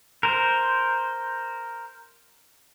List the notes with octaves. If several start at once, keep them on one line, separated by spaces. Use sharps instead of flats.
A#4 C5